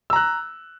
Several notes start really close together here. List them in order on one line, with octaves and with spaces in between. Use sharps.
E6 A#5 F#6